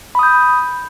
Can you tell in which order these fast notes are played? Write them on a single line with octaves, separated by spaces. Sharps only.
B5 D#6 G6